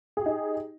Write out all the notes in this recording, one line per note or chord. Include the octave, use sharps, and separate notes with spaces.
D#4 G4 G#4